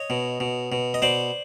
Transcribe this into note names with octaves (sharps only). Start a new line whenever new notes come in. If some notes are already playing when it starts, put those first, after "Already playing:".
Already playing: C#5 D#5
B2
B2
B2
D#5
B2 C5 D5